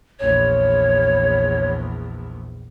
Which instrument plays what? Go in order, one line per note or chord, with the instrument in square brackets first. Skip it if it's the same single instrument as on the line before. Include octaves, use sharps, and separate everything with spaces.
[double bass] A#1 E2 [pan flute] C#5